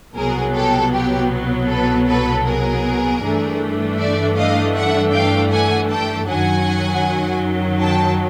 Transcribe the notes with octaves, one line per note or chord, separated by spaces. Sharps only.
C2 B2 F#3 B3 G#4 A#4
G4 A4
G4
A4 B4
A4 B4
G#4 A#4
G2 E3 A3 D4
D5 E5
D#5 F5
E5 F#5
F5 G5
F#5 G#5
G5 A5
F#2 D#3 F#3 F#5 G#5
G5 A5